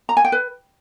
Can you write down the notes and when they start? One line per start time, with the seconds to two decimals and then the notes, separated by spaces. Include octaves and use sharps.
0.09 A#5
0.17 G#5
0.24 G5
0.32 B4